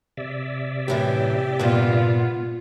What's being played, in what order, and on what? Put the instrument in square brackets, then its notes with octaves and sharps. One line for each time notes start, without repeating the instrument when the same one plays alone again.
[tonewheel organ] C3 D5 E5
[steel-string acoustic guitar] F#2 A2 E3 [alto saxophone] G4
[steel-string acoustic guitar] G2 A#2 [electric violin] B3 F4